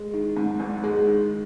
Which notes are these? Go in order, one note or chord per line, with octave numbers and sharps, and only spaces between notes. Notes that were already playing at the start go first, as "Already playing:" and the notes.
Already playing: G#3
D#3
G#2
G#1
G#3
D#3